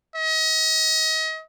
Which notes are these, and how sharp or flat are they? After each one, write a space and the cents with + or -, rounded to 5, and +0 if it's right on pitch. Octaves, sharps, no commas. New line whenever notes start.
D#5 +35